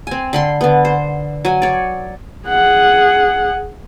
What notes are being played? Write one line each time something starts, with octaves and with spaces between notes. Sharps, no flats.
C4 G#5
D3 B5 C6
D3 B3
C5
F#3 G#5
C#5 D5
G#4 F#5